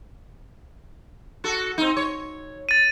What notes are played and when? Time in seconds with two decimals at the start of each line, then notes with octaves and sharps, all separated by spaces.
1.44 F#4 A4
1.78 C4 D#4
1.97 C#5
2.69 A6 D#7